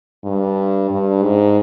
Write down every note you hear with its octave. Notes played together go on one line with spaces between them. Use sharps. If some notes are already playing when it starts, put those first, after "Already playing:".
G2
G2
G#2